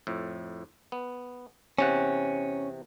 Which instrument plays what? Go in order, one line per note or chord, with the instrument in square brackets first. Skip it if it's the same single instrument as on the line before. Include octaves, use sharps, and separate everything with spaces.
[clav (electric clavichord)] F2 A2
B3
[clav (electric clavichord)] E2 C3 F#5 [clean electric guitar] C#4